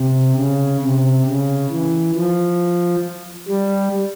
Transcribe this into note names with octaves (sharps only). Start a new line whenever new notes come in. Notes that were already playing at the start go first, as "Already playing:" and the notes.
Already playing: C3
C#3
C3
C#3
E3
F3
G3